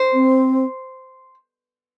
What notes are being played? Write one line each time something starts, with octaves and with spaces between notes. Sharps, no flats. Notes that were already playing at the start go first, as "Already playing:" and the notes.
Already playing: C5
C4